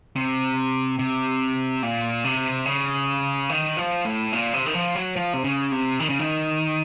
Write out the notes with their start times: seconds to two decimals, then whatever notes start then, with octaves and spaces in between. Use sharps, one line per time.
0.16 C3
0.99 C3
1.83 A#2
2.24 C3
2.66 C#3
3.49 D#3
3.77 F3
4.05 A2
4.33 A#2
4.53 C3
4.66 D#3
4.74 F3
4.95 F#3
5.16 F3
5.33 C3
5.44 C#3
5.72 C3
5.99 D#3
6.09 C#3
6.19 D#3